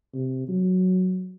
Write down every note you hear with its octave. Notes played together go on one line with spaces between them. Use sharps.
C3
F#3